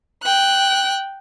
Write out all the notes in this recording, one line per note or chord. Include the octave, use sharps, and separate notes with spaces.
G5 F#6